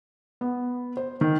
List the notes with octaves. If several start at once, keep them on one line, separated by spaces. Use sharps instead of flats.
B3
C5
D#3